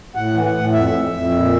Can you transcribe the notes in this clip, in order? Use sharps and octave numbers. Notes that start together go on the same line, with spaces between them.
A2 F#5
E3
F#5
A2
F2 E5
F2
F2
A#2